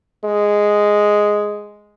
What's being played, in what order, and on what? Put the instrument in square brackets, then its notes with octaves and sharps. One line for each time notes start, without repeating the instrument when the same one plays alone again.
[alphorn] G#3